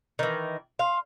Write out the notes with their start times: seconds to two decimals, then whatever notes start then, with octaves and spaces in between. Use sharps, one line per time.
0.19 D#3 E3
0.79 F5 C6